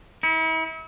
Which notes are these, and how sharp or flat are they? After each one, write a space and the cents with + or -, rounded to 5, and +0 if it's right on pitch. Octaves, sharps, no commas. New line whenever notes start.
E4 -40